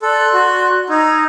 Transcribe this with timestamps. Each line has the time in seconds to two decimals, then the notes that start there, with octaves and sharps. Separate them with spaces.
0.02 A4 D5 C6 F#6
0.34 F#4
0.89 D#4 A#5 E6 G#6